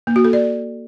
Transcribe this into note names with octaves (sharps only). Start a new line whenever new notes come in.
A#3
F#4
A4
D5